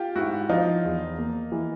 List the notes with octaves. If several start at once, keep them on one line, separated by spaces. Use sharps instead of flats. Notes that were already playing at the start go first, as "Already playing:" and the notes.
Already playing: F4 G4
G#2 E4 F#4
F3 D#4 F4
E2
A#3
E3